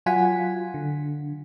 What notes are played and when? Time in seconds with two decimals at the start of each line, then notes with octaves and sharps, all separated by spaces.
0.06 F#3 F4 F#5 G#5 B6
0.74 D3